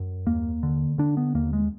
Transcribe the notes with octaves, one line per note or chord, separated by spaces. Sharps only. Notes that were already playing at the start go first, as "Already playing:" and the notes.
Already playing: F#2
D#2 A#3
D3
D3 D4
B3
D#2 A#3
G#3